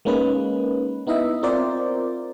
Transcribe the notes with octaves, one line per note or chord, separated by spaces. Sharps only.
G#3 A#3 C#4 D#4 B4
B3 D#4 E4 D#5 E5
C4 F4 A#4 C5 D5